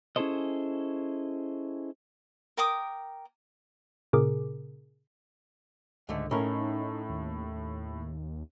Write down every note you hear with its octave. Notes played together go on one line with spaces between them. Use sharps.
C#4 E4 G#4 A4 C5 D#5
A#4 G5 D6 D#6
A#2 C#3 G#4 A#4 D6
C#2 G#2 D3 A3
A2 C#4 D#4 A#4
D#2